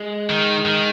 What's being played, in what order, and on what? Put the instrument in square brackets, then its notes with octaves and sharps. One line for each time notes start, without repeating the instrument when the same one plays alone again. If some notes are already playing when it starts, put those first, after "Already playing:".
Already playing: [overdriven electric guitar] G#3
[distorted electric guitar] D#3
D#3